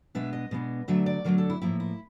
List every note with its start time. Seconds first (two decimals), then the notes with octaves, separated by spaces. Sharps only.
0.15 B2 G#3 B3 D4 E5
0.33 D#5
0.51 B2 G#3 B3 D4
0.88 D3 F#3 A3 D4 E5
1.06 D5
1.24 D3 F#3 A3 D4 A#4
1.38 A4
1.50 E4
1.62 A2 F3 A#3 E4
1.80 E4